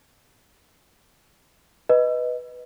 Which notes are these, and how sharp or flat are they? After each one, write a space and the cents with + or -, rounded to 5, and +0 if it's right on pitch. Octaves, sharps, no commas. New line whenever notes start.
B4 +0 D#5 +0